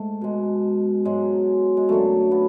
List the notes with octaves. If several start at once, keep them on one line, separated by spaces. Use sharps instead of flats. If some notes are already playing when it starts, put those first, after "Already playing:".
Already playing: G#2 A3
B2 G#3
G#2 F#3 G#3
G#3
F#2 D3 F#3 A3
B3